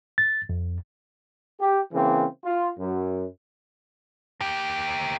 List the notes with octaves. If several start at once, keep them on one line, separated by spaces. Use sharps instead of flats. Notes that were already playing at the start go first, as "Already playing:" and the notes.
A6
F2
G4
C#3 E3 A#3 C4
F4
F#2
A#3 G4